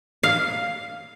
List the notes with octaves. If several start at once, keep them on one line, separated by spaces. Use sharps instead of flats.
F5